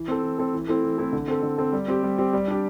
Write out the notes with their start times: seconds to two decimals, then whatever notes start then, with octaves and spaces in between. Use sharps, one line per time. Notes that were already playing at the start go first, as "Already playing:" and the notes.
Already playing: E3
0.08 C4 A4
0.23 E3
0.38 C4 A4
0.54 E3
0.68 A3 C4 E4 A4
0.83 E3
0.98 A3 C4 E4 A4
1.13 D3
1.28 C4 A4
1.43 D3
1.58 C4 A4
1.72 G3
1.88 C4 G4
2.03 G3
2.18 C4 G4
2.33 G3
2.48 D4 G4